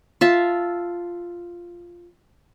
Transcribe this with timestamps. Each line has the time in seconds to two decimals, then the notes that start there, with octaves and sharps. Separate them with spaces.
0.21 F4 E5 A5